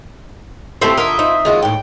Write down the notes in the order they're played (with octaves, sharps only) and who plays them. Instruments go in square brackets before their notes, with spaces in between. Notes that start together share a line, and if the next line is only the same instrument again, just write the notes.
[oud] A3 A4 C5 [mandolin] C4 G4 [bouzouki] E4 F4
[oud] D3 A#4 [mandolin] D#5 E5
[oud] C4 D#4
[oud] D#2 [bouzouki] G#3 F4 F#4
[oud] D#2 A2 [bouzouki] G5